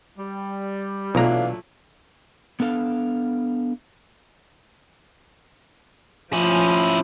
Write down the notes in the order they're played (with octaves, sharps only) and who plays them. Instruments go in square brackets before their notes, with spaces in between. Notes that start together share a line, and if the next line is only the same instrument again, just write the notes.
[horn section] G3
[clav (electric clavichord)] B1 A#5 [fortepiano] A#2 F#3 A3 [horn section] E3 D4 F5
[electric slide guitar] B3 D4 A4 F5
[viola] F3 [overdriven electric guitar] C#4 E4